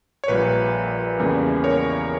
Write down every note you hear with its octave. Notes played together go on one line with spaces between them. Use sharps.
C#5
A#1 A#2 G3 B4
E2 C#3 G3 A#3
A#4 C#5